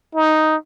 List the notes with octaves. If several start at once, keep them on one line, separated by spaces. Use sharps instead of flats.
D#4